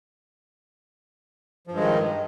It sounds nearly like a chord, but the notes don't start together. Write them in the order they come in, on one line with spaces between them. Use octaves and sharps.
F3 G2 G#3 D#3